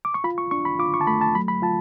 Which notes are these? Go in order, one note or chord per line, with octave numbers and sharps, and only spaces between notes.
D6
C#6
F4 B5
C#6
D4 C#6
B5
F4 D6
C#6
A5
A3 B5
A5
F#3 B5
B5
F4 A5